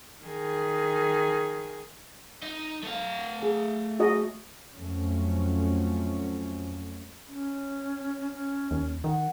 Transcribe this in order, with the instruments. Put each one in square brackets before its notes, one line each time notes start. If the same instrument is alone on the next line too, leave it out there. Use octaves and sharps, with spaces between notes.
[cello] D#3 G#4
[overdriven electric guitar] D#4 D#5
A3 F5
[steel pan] G#4
F#4 G#4 D#5
[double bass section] F2 F#3 A3 C#4
[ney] C#4
C#4
[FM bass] D#2
[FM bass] D#3 [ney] F#5